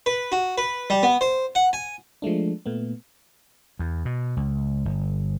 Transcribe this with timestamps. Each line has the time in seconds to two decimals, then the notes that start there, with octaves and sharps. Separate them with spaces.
0.06 B4
0.32 F#4
0.58 B4
0.90 G3
1.03 B3
1.21 C5
1.55 F#5
1.73 G#5
2.22 F3 G#3 A3 D4
2.66 A#2 A3 B3
3.79 E2
4.05 B2
4.37 C#2
4.85 G1